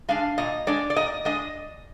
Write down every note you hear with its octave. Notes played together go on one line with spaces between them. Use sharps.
G#3 D4 F5
A#2 D#5
G#3 D4 D5
D5
A#2 D#5
G#3 D4 D#5